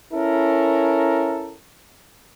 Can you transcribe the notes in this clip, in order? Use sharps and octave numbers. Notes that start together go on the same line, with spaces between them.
C#4 E4 A4 A#4